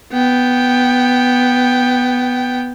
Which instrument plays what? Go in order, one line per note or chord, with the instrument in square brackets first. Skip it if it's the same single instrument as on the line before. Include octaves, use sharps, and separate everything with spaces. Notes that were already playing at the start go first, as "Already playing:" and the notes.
[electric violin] B3 G5